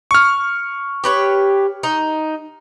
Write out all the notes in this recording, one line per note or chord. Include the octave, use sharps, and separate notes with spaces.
C#6 F6
G4 B4 C#5
D#4